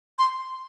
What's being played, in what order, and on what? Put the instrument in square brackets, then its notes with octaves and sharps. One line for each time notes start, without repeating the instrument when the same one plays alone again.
[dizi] C6